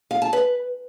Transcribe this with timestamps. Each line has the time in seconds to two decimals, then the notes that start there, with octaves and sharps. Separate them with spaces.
0.11 F5
0.22 A5
0.33 B4